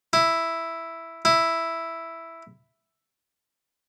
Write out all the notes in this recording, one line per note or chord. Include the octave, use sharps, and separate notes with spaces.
E4
E4